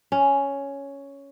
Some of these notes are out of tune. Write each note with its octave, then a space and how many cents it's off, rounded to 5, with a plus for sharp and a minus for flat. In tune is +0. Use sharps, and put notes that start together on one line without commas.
C#4 +5